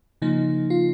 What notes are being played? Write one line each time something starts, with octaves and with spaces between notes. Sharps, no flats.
C#3 F3 A#3 D#4
F4